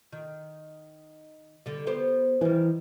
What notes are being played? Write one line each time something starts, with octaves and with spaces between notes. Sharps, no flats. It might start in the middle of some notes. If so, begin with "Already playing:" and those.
D#3
D3 G3
B3 G4 C5
D#3 E3 G3